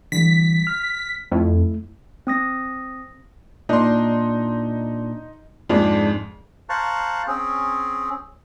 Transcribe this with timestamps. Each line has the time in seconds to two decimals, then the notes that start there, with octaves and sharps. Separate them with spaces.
0.12 D3 E3 G3 B6
0.67 F6
1.31 F2 A3 E4
2.27 C4 D#6 A#6
3.69 A#2 D4 D#4 C6
5.69 F2 G#2 F3 G#3 D4
6.69 C5 F5 A5 A#5 C#6 F#6
7.28 C4 C#4 G#4